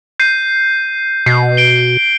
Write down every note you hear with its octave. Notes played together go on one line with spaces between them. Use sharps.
G6 C7 D#7
B2 C7
D7 G7